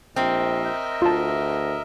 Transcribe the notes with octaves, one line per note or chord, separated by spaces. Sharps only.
A#1 C4 A#4 D#5 E5
D2 F4 A5